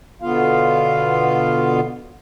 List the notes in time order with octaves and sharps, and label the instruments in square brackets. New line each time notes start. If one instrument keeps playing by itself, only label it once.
[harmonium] B2 D3 B3 F4 F5